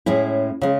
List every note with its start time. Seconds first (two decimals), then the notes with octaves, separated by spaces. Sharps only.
0.06 A2 G#3 C#4 E4
0.62 C#3 G#3